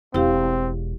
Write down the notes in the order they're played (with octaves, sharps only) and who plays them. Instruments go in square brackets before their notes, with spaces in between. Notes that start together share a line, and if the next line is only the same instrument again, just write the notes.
[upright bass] E1 [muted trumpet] C4 [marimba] E4 G4 F5